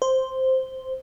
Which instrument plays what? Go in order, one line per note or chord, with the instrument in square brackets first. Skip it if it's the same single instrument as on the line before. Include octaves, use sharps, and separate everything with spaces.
[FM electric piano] C5